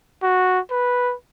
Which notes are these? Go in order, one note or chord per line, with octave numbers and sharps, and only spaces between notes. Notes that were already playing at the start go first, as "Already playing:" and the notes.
F#4
B4